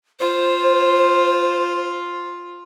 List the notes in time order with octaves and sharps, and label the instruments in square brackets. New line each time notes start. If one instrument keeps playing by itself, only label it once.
[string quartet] F4 [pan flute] C5